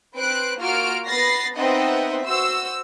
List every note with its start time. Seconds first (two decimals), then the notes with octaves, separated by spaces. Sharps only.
0.15 C4 B4 C5 F#6 D7
0.59 A#3 F4 F#4 F6 D7
1.07 B3 B5 A6 A#6 C7
1.57 B3 C4 D#4 D#5 E5 F#5
2.25 F#4 C5 E6